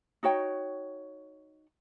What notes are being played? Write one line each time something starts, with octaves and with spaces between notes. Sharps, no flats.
D#4 F#4 C#5 G5